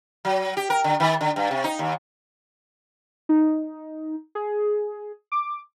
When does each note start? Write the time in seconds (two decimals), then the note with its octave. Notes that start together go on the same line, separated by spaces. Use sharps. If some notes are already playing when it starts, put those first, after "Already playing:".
0.25 F#3
0.57 G4
0.70 A#4
0.84 D3
1.00 D#3
1.21 D3
1.36 G2
1.51 C3
1.64 D#4
1.79 D#2
3.29 D#4
4.35 G#4
5.32 D6